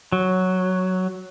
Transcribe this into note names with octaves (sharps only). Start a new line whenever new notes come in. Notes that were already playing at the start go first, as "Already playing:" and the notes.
F#3